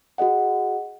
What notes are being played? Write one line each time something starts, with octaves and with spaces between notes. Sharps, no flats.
F#4 G#4 D#5 F#5